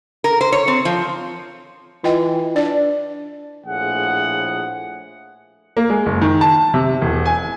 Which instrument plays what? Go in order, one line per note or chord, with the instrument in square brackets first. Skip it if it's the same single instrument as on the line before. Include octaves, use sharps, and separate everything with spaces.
[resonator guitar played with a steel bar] A#4
C5
C#5
C4
F3
[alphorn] E3 [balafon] F4 D#5 G5
[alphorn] D4 [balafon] D5
[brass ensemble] A#1 A2 F3 G#4 F#5
[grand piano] A#3
G#3
F#1
D#3
A5
C3
E1
G#5